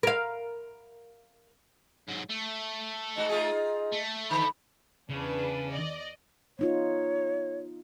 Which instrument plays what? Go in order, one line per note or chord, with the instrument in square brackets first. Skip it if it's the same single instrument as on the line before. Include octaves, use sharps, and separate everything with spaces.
[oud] A#4 F5
[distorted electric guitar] G#2 F#3
A3
[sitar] G#2 F#4 [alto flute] D#5
[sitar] D#4 F4 G#4
[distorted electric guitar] A3
[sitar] D3 [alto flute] B5
[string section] E2 D4 B4 [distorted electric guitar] C#3
[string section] D5 D#5
[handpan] B3 D#4 F4 [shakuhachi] C#5